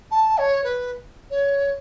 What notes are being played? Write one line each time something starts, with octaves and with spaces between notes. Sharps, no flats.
A5
C#5
B4
C#5